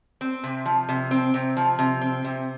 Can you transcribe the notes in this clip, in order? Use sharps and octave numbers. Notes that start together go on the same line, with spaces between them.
C4
C3
F3
C3
C4
C3
F3
C3
C4
C3